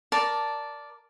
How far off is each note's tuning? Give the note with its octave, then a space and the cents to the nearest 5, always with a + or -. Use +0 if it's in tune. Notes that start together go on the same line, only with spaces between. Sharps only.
A#4 +10 D5 -5 A5 +0